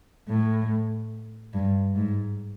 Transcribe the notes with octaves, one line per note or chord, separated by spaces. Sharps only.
A2
G2
G#2